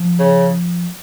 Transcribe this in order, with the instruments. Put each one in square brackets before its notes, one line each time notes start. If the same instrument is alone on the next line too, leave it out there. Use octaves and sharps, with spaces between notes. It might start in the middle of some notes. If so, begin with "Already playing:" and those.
Already playing: [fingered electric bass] F3
[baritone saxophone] C#3